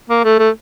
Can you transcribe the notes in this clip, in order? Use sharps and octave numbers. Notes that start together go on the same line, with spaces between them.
A#3
A3
A3